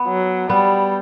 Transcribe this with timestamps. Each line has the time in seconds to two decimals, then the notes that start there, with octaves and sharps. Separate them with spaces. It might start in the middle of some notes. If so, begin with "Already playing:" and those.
Already playing: B3
0.08 F#3
0.50 G3 B3